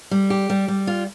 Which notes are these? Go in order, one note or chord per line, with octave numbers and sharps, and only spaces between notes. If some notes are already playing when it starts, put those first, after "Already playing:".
G3
G4
G3
G3
F4